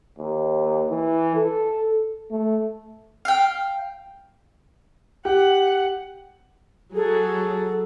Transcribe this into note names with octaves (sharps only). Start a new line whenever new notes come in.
D#2
E3
A4
A3
F5 G5
G4 F#5
F#3 G#4 A4